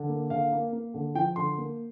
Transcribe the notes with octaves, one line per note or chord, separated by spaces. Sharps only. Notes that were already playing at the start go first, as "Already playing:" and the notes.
Already playing: D3
A#3
D3 F5
A#3
A#3
D3
F3 G5
D3 C6
A#3